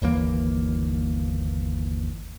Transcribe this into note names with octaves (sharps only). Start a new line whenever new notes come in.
G1 D#2 E3 A#3